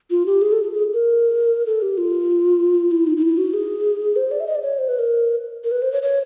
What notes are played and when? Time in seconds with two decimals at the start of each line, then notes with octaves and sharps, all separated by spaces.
0.10 F4
0.26 G4
0.42 G#4
0.52 A4
0.63 G#4
0.73 G#4
0.94 A#4
1.66 A4
1.82 G4
1.98 F4
2.91 E4
3.07 D#4
3.17 D#4
3.22 E4
3.38 F#4
3.54 G#4
4.16 C5
4.31 D5
4.40 E5
4.47 D#5
4.55 D5
4.63 C#5
4.78 C5
4.89 B4
4.99 A#4
5.64 A#4
5.71 B4
5.82 C5
5.92 C#5
6.03 C#5